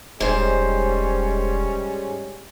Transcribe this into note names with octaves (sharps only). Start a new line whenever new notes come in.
E1 G#2 G3 G#3 C#4 C5